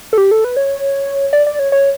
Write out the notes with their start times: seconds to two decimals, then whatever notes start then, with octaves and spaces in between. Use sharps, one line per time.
0.13 A4
0.18 G4
0.31 A4
0.44 B4
0.57 C#5
1.33 D5
1.47 D5
1.59 C#5
1.72 C#5